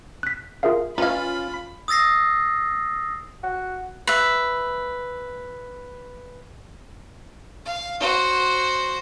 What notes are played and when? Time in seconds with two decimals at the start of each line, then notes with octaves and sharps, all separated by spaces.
0.23 F#6 B6
0.63 F4 G#4 A#4 E5 F5
0.98 C#4 F4 B4 F5 B5
1.88 D#6 E6 A6 A#6 C7
3.43 F#4
4.07 B4 E5
7.66 F5
8.01 F#4 C5